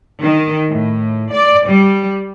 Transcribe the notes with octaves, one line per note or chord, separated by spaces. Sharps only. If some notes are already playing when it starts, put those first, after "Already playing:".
D#3
A2
D5
G3